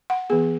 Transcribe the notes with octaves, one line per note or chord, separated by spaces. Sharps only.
F#5
E3 B3 G#4